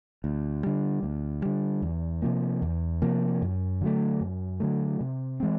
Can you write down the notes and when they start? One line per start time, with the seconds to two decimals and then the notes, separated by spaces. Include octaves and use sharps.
0.24 D2
0.63 D3 G3
1.03 D2
1.42 D3 G3
1.82 E2
2.22 C3 F3 A#3
2.62 E2
3.02 C3 F3 A#3
3.42 F#2
3.81 D3 F#3 A3
4.21 F#2
4.60 D3 F#3 A3
5.01 C3
5.40 E3 G#3 C4